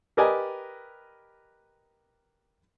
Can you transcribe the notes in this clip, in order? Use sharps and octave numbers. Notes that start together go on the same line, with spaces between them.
G4 A#4 B4 D5 D#5 G#5